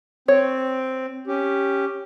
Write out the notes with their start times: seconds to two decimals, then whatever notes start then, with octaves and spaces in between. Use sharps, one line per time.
0.28 C4 C#5
1.27 C#4 G4